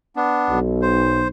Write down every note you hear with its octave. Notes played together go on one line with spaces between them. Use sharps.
B3 D4
B1
C5